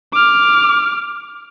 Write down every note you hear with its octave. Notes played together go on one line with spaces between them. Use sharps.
D6 F6